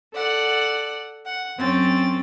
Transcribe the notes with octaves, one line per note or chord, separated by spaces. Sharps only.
A4 D5 F#5
F#5
F#2 C4 C#4 A6